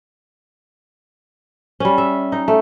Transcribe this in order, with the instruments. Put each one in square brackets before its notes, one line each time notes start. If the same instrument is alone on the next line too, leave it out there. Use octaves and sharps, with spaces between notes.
[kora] G3 C#4
E5
D#4
A3